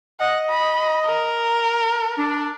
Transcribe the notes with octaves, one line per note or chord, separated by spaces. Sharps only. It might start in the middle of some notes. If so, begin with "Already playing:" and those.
D#5 F#5
B5
A#4
D4